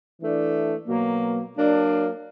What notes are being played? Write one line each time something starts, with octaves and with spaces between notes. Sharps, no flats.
E3 A3 D4
B2 F#3 A#3
F#3 A#3 D4